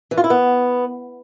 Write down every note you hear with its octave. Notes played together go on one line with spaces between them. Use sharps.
E3
F4
E4
B3